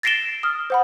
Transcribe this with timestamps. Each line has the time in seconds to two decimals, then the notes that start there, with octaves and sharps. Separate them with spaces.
0.03 A6 A#6 C7 D7 E7 G7
0.43 D#6 F6
0.70 C5 F#5 B5